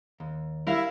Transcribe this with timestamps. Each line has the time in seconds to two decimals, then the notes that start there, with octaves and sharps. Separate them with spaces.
0.20 D#2
0.67 G3 E4 A#4 F5